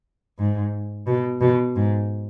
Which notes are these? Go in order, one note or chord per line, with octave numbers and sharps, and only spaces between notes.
G#2
B2
B2
G#2